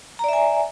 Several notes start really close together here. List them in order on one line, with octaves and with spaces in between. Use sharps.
A#5 D5 E5 G#5